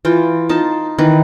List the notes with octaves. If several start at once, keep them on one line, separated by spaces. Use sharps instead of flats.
E3 F4 G5
D#4 F4 A5
D#3 E3 B4